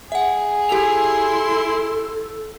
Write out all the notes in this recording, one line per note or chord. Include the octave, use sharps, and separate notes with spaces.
G#4 E5 F#5
E4 G4 A4 C6 F7